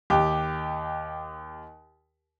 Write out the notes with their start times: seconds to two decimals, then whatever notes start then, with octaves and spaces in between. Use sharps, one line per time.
0.10 D#2 G4